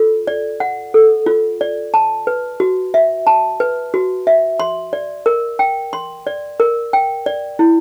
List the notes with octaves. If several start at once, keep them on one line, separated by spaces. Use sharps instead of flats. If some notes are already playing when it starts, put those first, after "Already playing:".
Already playing: F4 A4
D5
F#5
A4
F4
D5
A5
B4
F#4
E5
A5
B4
F#4
E5
C6
D5
A#4
G5
C6
D5
A#4
G5
D5
E4